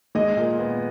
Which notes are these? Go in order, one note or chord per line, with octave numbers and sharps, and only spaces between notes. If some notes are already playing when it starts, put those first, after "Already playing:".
G#3 D#5
A#2
B3